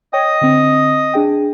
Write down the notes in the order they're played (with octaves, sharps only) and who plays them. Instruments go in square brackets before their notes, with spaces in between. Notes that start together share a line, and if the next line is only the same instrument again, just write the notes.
[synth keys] C#5 G5 [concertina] D#5 D#6
[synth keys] D3 C4
D4 G#4 G5